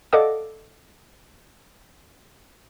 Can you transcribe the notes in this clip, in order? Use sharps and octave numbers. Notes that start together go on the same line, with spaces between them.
A4 D5 D#5 F5 F#5 D6